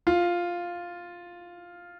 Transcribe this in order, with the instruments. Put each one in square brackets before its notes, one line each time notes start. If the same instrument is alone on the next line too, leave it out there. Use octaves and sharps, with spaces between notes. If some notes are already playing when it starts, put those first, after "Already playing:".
[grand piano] F4